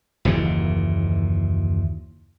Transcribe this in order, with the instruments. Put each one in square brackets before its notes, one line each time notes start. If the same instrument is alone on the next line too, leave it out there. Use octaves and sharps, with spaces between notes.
[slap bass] F#1 D#2 A#2 E3